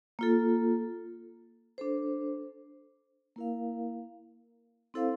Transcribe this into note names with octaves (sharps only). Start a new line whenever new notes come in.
A#3 F4 A4
D4 A4 C5
A#3 E4 A#4 F5
C4 E4 A4 C5 F5